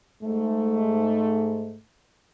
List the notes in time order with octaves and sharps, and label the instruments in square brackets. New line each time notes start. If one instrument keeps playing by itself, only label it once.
[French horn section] G#2 A3